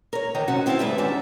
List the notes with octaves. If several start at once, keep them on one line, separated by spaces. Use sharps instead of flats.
A#4 C#5
E2 D#3 C#5 D#5 A#5
F#2 C3 C#4 F#4 F#5
D#3 C4 E4 F4 F5 A5
D2 G#2 G3 B4 E5
E2 D#3 C#4 D4 E5